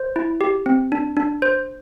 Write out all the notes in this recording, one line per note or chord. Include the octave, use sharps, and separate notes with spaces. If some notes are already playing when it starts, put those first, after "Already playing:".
Already playing: C5
E4
G4
C4
D4
D4
C5